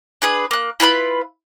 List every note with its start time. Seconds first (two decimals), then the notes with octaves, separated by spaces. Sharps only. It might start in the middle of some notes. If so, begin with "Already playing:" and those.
0.22 D4 G#4 B4
0.51 A#3 F#6
0.80 E4 F4 B4 B5